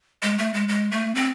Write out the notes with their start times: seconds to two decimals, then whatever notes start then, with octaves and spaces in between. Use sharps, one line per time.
0.23 G#3
0.38 A3
0.54 G#3
0.68 G#3
0.91 A3
1.15 C4